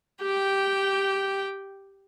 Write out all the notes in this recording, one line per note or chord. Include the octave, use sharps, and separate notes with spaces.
G4 G5